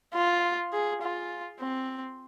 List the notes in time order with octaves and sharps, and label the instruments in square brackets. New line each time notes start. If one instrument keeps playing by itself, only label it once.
[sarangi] F4
G#4
F4
C4